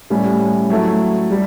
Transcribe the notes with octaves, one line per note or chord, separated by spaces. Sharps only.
A2 G3 C#4
F#3 A3 E4
G3